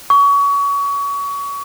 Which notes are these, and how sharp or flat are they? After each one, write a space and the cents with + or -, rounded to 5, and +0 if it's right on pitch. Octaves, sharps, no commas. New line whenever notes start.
C#6 +30